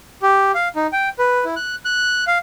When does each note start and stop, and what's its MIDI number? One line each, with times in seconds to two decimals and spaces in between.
0.22 0.52 67
0.55 0.68 77
0.76 0.87 63
0.93 1.09 79
1.19 1.45 71
1.45 1.55 64
1.56 1.75 90
1.85 2.24 90
2.27 2.38 77